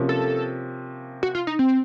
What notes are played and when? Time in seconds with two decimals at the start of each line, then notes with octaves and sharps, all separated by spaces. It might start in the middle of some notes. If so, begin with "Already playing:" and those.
Already playing: C3 F3 A#3 C#4
0.09 A4
1.23 F#4
1.35 F4
1.47 D#4
1.59 C4